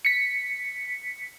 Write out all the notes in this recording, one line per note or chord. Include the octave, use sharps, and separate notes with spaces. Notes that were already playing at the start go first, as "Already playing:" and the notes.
B6 C#7